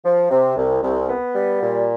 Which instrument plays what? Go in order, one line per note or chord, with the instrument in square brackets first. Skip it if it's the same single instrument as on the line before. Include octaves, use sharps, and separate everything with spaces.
[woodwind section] F3
C3
C2
C2
B3
G3
A#2